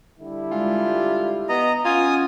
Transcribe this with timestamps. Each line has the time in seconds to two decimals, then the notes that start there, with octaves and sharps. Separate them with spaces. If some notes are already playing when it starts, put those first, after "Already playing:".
0.19 D3 G3 E4
0.52 G#3 F4
0.87 G4
1.49 B3 D#5 A#5
1.85 C#4 F4 F#5 G#5 D#6